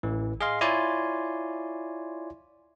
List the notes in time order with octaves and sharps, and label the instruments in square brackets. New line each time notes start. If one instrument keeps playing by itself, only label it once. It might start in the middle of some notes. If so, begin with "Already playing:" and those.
[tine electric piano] A1 E3
G#4 D#5 F5 C6
E4 F4 C#5 D5 G#5 C6